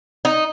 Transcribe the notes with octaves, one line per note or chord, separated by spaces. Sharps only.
D#4